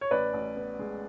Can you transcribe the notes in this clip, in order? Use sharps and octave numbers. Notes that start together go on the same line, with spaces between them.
C#5
A1 B4 D5
A1
B3
G#3